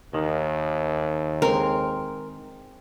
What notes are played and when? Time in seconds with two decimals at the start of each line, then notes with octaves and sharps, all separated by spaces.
0.14 D#2 D#3
1.42 G#3 C4 A#4